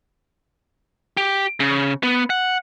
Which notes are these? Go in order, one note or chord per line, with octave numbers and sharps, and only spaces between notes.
G4
C#3
B3
F#5